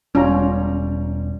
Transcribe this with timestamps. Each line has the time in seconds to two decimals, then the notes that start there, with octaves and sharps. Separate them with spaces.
0.15 E1 G3 C#4 F4 A#5